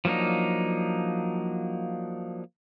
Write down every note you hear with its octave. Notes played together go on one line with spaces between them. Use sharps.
F3 F#3 A#3 D4 D#4